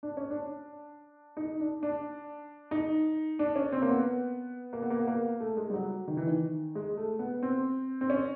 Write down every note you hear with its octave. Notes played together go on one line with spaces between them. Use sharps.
D4
C#4
D4
D#4
D4
D4
D#4
D4
C#4
C4
A#3
B3
A#3
B3
A#3
B3
A#3
A3
G#3
G3
F#3
D#3
E3
D#3
G#3
A3
B3
C4
C4
C#4